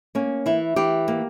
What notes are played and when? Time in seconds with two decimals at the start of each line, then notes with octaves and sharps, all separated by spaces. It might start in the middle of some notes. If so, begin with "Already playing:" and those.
0.15 A#3 C#4
0.46 E3 E4
0.76 E3 G4
1.08 A#3